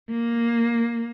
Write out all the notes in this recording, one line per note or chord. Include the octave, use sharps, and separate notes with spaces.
A#3